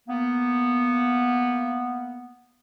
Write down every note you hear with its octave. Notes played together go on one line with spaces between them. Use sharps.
A#3 B3